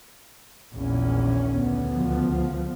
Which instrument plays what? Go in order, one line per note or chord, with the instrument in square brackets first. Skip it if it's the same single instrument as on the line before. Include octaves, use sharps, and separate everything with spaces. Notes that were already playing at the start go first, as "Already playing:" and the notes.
[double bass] A#1 E2 [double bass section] D#3 C#4
[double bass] D2 [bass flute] B3
[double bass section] C#2 F3